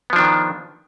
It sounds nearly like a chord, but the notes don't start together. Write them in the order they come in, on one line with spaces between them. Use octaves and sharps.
B3 F3 D4 D#3